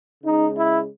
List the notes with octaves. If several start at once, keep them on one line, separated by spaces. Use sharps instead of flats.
C#3 G#3 D#4
E4